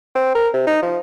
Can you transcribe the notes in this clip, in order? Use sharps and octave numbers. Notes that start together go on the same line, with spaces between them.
C4
A#4
C3
D#4
F3